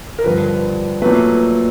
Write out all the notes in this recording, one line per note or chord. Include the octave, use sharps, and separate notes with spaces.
A#4
G2 D3 F3 B4
A#2 F#3 A3 B4